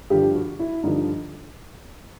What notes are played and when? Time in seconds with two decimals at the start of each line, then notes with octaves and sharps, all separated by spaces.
0.10 G2 D3 F3 G4
0.35 F#4
0.59 E4
0.83 G2 D3 F3 D#4